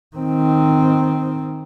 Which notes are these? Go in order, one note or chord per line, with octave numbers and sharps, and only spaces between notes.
D#3 C4